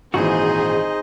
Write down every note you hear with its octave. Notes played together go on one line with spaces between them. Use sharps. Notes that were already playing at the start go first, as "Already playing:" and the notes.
G#1 A#2 E3 D#4 F#4 G#4 C5 D#5